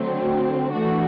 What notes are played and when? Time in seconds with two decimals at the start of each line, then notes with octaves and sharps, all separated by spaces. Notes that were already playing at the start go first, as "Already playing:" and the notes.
Already playing: D3 F#3 A3 C4
0.72 E3 A3 D4 F#4